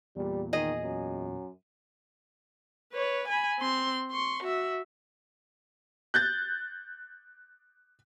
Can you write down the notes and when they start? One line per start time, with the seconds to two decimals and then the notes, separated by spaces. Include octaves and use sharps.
0.16 E2 A#2 G3
0.53 D#3 G#4 D#5
0.82 F#2
2.93 B4 C#5
3.28 G#5 B5
3.60 C4 C6
4.11 C6 C#6
4.43 F#4 E5
6.14 F#6 G6 A6